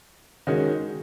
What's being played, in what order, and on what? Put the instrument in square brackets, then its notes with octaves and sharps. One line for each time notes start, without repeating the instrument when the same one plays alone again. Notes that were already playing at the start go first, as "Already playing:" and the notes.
[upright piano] D#3 G#3 C#4 F#4